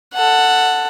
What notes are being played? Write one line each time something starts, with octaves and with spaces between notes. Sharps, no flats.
A4 F#5